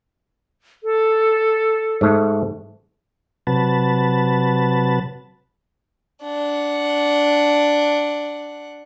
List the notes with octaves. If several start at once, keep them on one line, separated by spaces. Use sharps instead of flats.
A4
G#2 A3
C3 F#3 B4 A5
D4 F#5